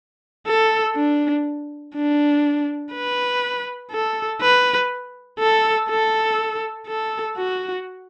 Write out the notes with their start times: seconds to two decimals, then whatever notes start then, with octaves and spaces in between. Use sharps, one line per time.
0.47 A4
0.95 D4
1.95 D4
2.92 B4
3.91 A4
4.41 B4
5.39 A4
5.89 A4
6.87 A4
7.37 F#4